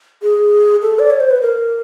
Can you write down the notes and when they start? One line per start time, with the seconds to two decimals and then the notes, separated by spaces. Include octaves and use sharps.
0.23 G#4
0.82 A4
0.99 D5
1.10 C#5
1.20 C5
1.31 B4
1.42 A#4